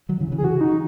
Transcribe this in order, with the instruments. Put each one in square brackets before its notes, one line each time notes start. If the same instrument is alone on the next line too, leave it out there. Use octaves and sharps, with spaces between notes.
[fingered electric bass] D#3 F#3
C#3 E3
C#3 E3
[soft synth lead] G#4
[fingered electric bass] C#3 E3 [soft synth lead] F#4
[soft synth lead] D#4